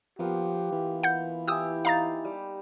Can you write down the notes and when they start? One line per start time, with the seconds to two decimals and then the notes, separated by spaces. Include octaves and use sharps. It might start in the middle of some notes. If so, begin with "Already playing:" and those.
0.19 F3 A#3 B3 F4 G4
0.72 E3
1.03 F#5 G6
1.48 E4 G4 G#5 D#6 E6
1.85 D#4 F5 A#5 A6
2.25 G3